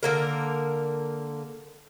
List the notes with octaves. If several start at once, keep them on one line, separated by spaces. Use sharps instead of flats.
D3 A#3 A#4